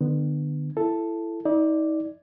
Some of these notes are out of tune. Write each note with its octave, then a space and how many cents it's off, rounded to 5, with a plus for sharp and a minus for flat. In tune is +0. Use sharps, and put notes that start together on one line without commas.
D3 +35 B3 +0
E4 +20 A4 +0
D#4 +40 D5 +0